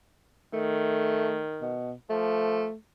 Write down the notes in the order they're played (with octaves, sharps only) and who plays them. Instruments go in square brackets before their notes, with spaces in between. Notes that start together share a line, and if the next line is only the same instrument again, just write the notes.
[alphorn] D#3 [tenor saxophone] A3
[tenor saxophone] B2
[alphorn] F3 [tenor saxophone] A3